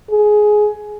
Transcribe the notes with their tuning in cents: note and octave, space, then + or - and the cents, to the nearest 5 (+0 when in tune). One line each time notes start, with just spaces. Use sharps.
G#4 +15